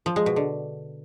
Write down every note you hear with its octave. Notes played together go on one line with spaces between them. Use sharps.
F3
G#3
B2
D3